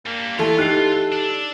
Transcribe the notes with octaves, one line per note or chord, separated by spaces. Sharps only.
G3 A#3 D4
E3 A3 F4 A4
D#4 G4 A4 F#6 C7
D4